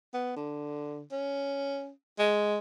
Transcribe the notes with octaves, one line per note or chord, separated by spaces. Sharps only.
B3
D3
C#4
G#3